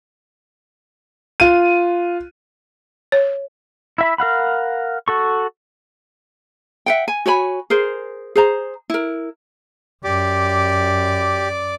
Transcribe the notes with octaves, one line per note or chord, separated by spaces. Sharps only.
F4 D#7
C#5
E4 E5 B5
A#4 F5 F#5 B5
F#4 A4 C#6
E5 F#5 G5
G#5
F#4 C#5 G#5 B5
G#4 A#4 C5
G#4 C5 A#5
E4 A#4
F#2 G4 D5 D6